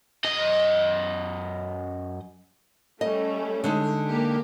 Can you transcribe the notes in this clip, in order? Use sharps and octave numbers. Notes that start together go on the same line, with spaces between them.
F#2 D#5
G3 A3 C#4 D#5
D3 G#3 D#4
A#3 G4